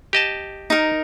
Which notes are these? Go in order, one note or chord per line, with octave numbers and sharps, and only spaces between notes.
G4 D#5 A5
D#4 A#4